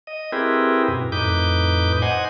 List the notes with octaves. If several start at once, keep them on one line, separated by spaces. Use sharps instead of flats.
D#5
C4 E4 G4 G#4 A#4 B4
F#2 B2
F2 A2 D#4 B4 D6 G6
C5 D#5 F#5 G#5